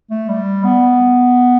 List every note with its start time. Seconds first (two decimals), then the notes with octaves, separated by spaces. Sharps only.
0.10 A3
0.29 G3
0.64 B3